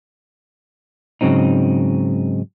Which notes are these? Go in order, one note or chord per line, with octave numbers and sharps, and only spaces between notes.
G#2 C#3 F#3 C4 D#4